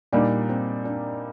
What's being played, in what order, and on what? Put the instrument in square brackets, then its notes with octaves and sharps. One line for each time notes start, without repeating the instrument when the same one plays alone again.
[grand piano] A#2 G3 A#3 D#4 [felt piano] D4
[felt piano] C4
D4